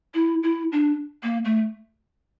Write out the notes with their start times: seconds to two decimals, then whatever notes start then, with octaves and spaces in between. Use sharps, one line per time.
0.14 E4
0.43 E4
0.72 D4
1.23 A#3
1.45 A3